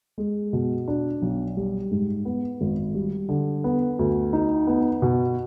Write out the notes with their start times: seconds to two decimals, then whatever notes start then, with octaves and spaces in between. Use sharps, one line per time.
0.18 G#3
0.53 B2
0.88 D4
1.22 B1
1.57 G3
1.91 G#2
2.25 B3
2.61 G#1
2.94 G3
3.29 D3
3.64 B3
3.99 D2
4.33 D#4
4.67 B3
5.02 B2